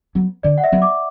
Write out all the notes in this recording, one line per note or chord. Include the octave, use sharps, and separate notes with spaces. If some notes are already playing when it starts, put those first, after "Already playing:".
F#3 B3
D3 D5
F#5
E5
F#3 B3
D6